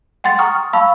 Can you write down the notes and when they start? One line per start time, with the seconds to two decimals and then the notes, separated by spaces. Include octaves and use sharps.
0.24 F#5 G5 C6 A6
0.39 G5 A#5 C#6 D#6 F6
0.73 F5 A5 B5 C#6 E6